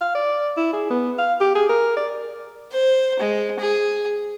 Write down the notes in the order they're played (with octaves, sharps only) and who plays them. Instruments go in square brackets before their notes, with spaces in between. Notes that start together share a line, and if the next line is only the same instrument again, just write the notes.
[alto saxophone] F5
D5
E4
G#4
B3
F5
G4
G#4
A#4
D5
[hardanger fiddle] C5
G#3
G#4